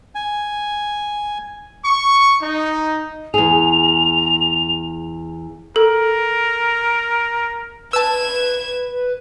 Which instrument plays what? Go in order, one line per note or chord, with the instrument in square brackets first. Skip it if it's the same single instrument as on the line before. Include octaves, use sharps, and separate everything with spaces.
[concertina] G#5
[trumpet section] C#6
D#4
[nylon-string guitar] E2 G#4 [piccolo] F7
[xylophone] A4 [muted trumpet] A#4
[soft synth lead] B4 [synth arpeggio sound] A5 E6 [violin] G#6 E7